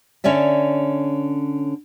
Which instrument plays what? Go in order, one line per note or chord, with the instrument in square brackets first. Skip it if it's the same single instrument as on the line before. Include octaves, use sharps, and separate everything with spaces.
[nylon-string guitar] D3 C#4 C#5 D5 E5